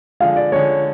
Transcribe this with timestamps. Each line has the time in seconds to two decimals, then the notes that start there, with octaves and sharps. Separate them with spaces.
0.20 D3 F3 G#3 F5
0.36 D5
0.52 D3 F3 G#3 C#5